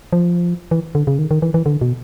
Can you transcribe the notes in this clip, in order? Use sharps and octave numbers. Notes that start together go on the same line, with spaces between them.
F3
E3
D3
C#3
D#3
D#3
E3
E3
D3
B2